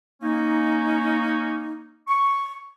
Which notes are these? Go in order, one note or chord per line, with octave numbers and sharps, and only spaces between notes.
A#3 C#4 D#4
C#6